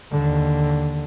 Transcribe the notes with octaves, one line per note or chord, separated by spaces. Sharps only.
D#2 D3